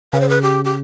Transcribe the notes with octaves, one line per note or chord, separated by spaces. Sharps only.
C#3 B4
C5
B4
G4
G4